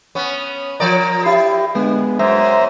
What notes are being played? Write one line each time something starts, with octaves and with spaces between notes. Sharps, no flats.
B3 C#4
F3 A#4 D5 A#5
E4 G4
D3 G#3 B3
F#2 C5 E5 A#5